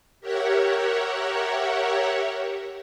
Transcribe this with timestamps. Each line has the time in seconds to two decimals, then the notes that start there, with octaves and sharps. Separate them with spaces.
0.20 G4 A#4 C#5 E5 F#5